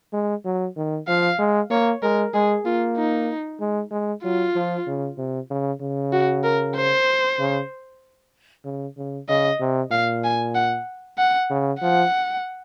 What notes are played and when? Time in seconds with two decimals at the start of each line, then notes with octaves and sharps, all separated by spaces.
0.13 G#3
0.45 F#3
0.77 D#3
1.08 F3 F5
1.39 G#3
1.71 A#3 C#5
2.02 G#3 A#4
2.34 G#3 G#4
2.65 A#3 F4
2.97 D#4
3.60 G#3
3.91 G#3
4.24 F#3 F4
4.55 F3
4.87 C#3
5.18 C3
5.50 C#3
5.81 C#3
6.13 F#4
6.44 A#4
6.76 C5
7.39 C#3
8.65 C#3
8.98 C#3
9.29 C#3 D#5
9.60 C3
9.91 A#2 F5
10.24 G#5
10.55 F#5
11.18 F#5
11.50 C#3
11.81 F3 F#5